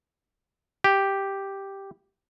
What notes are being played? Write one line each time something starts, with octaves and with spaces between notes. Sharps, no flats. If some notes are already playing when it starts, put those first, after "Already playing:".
G4